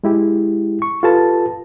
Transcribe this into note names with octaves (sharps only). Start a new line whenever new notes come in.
G#3 E4 G4
C#6
F4 G4 A4 B4 A5